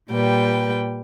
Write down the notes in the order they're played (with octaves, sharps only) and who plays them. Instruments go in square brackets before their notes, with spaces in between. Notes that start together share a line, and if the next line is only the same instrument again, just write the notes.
[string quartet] A#2 G3 B4 G5